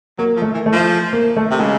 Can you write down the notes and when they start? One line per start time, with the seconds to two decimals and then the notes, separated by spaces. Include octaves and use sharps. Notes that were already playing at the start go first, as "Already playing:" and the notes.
0.19 F#3 A#3
0.36 F3
0.42 A3
0.54 E3
0.66 A3
0.72 F3
1.13 A#3
1.36 A3
1.51 C3
1.60 C#3 G#3